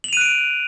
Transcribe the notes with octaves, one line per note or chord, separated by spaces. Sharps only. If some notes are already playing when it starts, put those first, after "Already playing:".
F#6 D7 D#7 F7 F#7